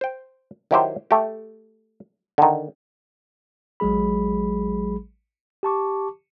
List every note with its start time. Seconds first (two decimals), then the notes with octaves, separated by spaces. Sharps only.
0.01 C5 G5
0.71 D#3 F#3 E4 F#4 G4 C5
1.11 A3 G4
2.38 D3 D#3
3.80 A1 F#3 G#3 G#4 B5
5.63 G4 A5 C#6 D6